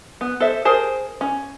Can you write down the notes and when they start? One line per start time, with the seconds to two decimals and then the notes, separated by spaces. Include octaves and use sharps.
0.21 B3
0.40 A4 C5 E5
0.65 G#4 A#4 C5 A5
1.21 C#4